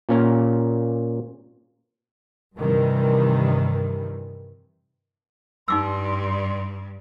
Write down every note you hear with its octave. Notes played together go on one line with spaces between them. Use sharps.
A#2 A#3 C#4 A#4 F5 A#5
G2 C3 D#3 E3 G3
G2 G3 D#4 C6 D6 E6